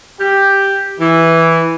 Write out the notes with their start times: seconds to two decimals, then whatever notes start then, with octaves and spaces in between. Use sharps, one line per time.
0.20 G4
1.00 E3